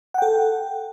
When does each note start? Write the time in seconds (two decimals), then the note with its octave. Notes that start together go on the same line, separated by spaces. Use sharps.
0.14 F#5
0.18 G5
0.22 A4